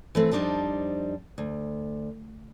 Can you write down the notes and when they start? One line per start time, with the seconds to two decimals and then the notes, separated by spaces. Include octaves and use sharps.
0.15 E3 A3 C4
0.31 F2 G3 D4 D#4 C5 A5
1.38 D2